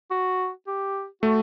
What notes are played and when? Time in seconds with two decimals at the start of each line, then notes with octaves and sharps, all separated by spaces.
0.11 F#4
0.67 G4
1.22 A3 F#4